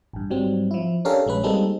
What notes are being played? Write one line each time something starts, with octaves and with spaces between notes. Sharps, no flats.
A1 G2
G#2 F#3 G3 C4
F3 E4
C#4 D4 G4 A4 A#4 F5
A#1 G#3 C#4 B4
G3 G#3 A#3 C4 D#4 A4